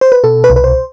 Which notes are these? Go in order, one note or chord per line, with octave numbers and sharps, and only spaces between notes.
C5
B4
B2 A4
B4
C2
B4
C5